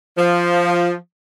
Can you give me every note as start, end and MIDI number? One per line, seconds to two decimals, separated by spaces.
0.18 0.94 53